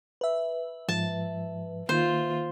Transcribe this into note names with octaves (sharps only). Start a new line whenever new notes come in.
B4 E5
G#2 F3 A5
D#3 A#3 F4 C5